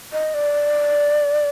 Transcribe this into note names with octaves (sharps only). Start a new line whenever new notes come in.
D#5
D5